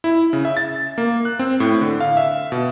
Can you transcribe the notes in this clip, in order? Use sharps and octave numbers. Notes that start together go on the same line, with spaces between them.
E4
C#3
E5
A6
A#3
F#6
C4
A2
D3
F5
E5
B2